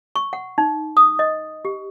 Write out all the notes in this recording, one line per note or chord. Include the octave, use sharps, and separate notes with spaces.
C#6
F#5
D#4
D#6
D#5
G4